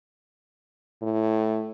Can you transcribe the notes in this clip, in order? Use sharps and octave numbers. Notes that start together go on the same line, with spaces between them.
A2